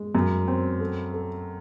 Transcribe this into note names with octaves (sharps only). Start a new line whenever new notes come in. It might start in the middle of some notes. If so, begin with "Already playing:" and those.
Already playing: G#3
F#2
C4
A4
A4